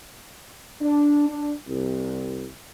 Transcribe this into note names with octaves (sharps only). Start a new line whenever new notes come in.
D4
D4
C2